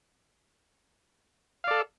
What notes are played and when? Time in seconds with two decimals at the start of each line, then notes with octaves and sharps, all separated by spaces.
1.64 F5
1.67 D5
1.71 A4